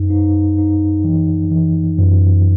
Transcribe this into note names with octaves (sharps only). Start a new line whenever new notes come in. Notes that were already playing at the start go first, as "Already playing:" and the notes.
Already playing: F#2 D#4
D#4
D#4
E3
E3
F#2